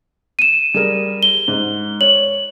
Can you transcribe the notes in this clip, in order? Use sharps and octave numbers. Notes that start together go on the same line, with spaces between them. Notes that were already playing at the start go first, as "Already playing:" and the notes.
D#7 E7
G3 G#4 A#4
G7
G#2
C#5 F#7